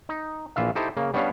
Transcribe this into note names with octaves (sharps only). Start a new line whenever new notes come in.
D#4
A#1 E3 F4 E5 F5
D#4 E4 G4 A4 C5
C#3 A#3
G3 B3 C#4 D4 C#5 F5